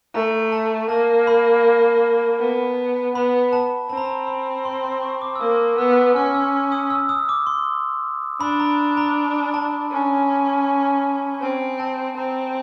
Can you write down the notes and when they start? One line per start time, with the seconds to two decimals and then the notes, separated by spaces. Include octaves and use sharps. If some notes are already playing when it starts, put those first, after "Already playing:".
0.14 A3 A#5
0.52 A5
0.89 A#3 A5
1.27 B5
2.39 B3
3.15 B3 B5
3.53 A5
3.90 C4 A5
3.97 A#5
4.05 A5
4.27 B5
4.65 C6
4.84 C6
5.02 C#6
5.22 D6
5.35 E6
5.40 A#3 D#6
5.78 B3 E6
6.15 C#4 F6
6.34 E6
6.72 D#6
6.90 E6
7.09 D#6
7.29 D6
7.47 C6
8.41 D4 B5
8.60 A#5
8.97 A#5
9.54 A5
9.92 C#4
11.41 C4 G#5
11.80 A5
12.17 C4 A#5